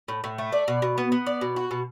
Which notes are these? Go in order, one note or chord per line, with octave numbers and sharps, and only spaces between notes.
A2
A2
A3
D5
B2
B2
B3
B3
D5
B2
F#4
B2